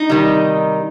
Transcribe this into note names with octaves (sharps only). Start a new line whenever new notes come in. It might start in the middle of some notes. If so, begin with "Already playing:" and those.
Already playing: D#4
C3 D#3 G3